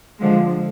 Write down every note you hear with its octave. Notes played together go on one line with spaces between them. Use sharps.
D3 F3 G#3